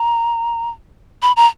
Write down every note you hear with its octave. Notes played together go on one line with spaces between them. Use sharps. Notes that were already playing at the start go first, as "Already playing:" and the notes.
Already playing: A#5
B5
A#5